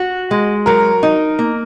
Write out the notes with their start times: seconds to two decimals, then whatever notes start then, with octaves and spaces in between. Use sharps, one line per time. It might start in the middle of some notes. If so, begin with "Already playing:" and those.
Already playing: F#4
0.31 G#3
0.66 F#3 A#4
1.03 D#4
1.39 A#3